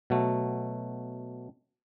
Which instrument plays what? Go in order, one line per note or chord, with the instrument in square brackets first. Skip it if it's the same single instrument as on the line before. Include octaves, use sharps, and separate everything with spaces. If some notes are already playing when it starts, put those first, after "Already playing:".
[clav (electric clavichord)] B2 F#3 A3